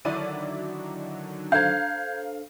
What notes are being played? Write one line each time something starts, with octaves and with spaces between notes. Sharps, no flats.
D3 D#3 F#3 E4 D5 D#7
D4 A4 C5 F5 A#5 G6 G#6